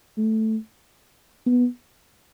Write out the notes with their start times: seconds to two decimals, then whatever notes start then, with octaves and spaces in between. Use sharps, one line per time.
0.18 A3
1.46 B3